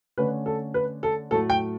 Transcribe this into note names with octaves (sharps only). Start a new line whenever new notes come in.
D3 A3 C#4 B4
A4
B4
A4
A2 F#3 A3 A4
G5